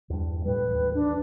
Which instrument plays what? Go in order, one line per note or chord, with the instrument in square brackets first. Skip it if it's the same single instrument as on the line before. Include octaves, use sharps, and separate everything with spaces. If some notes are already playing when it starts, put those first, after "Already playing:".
[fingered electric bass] E2 G2
[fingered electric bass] A2 G3 [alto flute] B4
[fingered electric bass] A1 D#2
[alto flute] D4